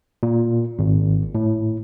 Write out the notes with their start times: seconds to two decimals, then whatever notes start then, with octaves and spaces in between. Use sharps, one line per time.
0.23 A#2
0.79 G#1
1.35 A2